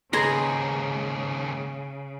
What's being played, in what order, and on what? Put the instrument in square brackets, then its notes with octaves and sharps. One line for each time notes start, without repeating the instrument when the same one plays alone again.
[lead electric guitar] D#2 G#2 [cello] C#3 [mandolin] D#4 G#4 B4 [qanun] A#5 C6